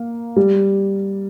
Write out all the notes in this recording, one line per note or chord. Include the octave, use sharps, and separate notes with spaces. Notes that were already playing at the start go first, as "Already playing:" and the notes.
Already playing: A#3
G3